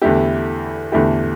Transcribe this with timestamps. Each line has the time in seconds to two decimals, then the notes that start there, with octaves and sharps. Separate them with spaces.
0.02 E2 D3 A3 E4 G4
0.92 E2 D3 A3 E4 G4